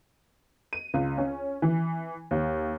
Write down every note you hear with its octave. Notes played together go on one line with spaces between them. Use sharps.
D#7
C#2
C#4
E3
D#2